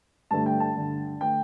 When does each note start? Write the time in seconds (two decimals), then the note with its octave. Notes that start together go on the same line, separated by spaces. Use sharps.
0.31 G2 D3 A3 A5
0.46 G5
0.60 A5
0.76 G2 D3 A3
1.21 D3 A3 G5